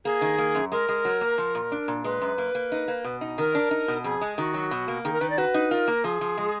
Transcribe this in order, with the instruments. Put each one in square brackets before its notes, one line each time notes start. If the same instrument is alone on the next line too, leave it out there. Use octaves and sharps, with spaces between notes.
[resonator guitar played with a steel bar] A#3 [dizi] G#4
[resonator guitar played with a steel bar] D#3
A#3
F#2
[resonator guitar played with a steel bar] G#3 [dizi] A#4
[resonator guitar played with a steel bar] G#3
F#3
A#3
F3
A#2
D4
A#2
[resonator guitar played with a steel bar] G#3 [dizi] B4
[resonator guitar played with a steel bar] F#2
A#3
A#3
D#4
A#3
B2
D#4
[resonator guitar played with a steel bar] D#3 [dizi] A#4
[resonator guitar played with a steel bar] D4
D#4
B2
[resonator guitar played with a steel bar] F2 [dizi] G#4
[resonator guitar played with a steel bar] G#3
[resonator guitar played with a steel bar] D#3 [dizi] F#4
[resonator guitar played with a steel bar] F#3
B2
A#3
[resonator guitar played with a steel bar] D#3 [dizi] G#4
[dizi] A#4
[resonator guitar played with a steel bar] D#3 [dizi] B4
[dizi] D5
[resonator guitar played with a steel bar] F#4 [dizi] B4
[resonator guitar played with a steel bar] D#4
[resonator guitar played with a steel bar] F4 [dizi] A#4
[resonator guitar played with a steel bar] A#3
[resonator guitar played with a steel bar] F3 [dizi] G#4
[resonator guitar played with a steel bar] F3
G#3